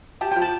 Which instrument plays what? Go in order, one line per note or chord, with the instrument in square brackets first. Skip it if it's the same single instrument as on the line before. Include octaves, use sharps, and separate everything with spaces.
[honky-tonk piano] G4 [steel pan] A5
[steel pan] G5
[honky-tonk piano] F3
[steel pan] A5